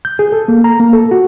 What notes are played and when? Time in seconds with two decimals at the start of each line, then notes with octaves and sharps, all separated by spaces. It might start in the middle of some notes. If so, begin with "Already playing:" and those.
0.05 G6
0.19 G#4
0.32 A4
0.48 A#3
0.64 A#5
0.80 A#3
0.93 A4
1.11 F#4